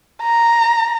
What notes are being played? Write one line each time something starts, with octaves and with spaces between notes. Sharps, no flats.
A#5